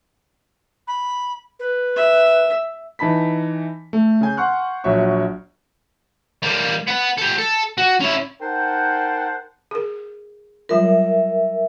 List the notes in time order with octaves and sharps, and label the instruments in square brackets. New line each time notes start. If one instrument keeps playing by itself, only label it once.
[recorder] B5
B4
[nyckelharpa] E5
[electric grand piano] E3 D#4 A5 B5 B6
A3
C#3 G#5 G6
F#5 G#5 C6 C#6 F6 F#6
A#1 F#3 C#5 E5 C#6
[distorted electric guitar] G3 A#3
B3 F#5
G4 A4
A4
F#4
C#4 E4
[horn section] D#4 A#4 C5 F#5 G5 A5
[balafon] G#4 A#4
[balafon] F#3 G3 F4 [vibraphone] A#4 E5